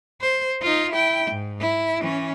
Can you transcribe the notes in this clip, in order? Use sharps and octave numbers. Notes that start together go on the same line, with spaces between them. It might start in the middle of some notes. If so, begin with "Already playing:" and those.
C5
D#4 F4
E4 G5
G#2
E4
E3 C#4